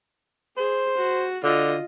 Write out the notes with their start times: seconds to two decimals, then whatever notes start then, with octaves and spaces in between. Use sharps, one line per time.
0.57 G#4 C5
0.97 F#4
1.43 D3 F4 D#5